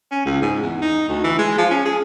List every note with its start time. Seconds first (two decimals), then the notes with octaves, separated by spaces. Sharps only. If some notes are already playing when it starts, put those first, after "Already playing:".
0.11 C#4
0.26 C#2
0.42 G#2
0.62 E2
0.82 D#4
1.09 D2
1.24 E3
1.38 G#3
1.58 F3
1.71 C#4
1.85 G#4